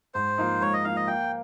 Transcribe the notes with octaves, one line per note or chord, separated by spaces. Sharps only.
G#2 C5
F3 A#3 D#4
G#2 C#5
D#5
F3 A#3 D#4 F5
D#5
A#3 G5